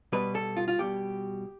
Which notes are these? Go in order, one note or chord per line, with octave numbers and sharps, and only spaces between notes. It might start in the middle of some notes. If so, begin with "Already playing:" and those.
B2 G3 B4
A4
F4
F4
B2 G3 G4